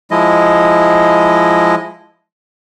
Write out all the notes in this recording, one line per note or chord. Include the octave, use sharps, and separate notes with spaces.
F3 G#3 E4 D#5